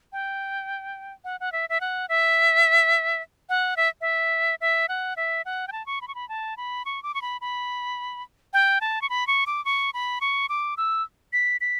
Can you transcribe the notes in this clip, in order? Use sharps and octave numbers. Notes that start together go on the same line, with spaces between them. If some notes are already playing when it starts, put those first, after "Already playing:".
G5
F#5
F#5
E5
E5
F#5
E5
F#5
E5
E5
E5
F#5
E5
F#5
G5
A5
C#6
B5
C#6
B5
A5
B5
C#6
D6
C#6
B5
B5
G5
A5
C#6
B5
C#6
D6
C#6
B5
C#6
D6
E6
B6
B6